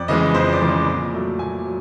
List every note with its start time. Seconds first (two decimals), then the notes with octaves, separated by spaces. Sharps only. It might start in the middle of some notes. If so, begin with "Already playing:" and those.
Already playing: F2 D5
0.08 C#3 E3 G#3 D#5
0.34 F2 C5
0.53 D5
0.61 C#3 E3 G#3
0.69 D5
0.87 A#2
1.13 F#3 A3
1.39 A#2 G#5
1.66 F#3